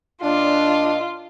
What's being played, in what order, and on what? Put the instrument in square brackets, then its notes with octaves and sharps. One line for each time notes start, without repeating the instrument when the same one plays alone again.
[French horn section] A#2 D#5 [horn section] D4 [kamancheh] F4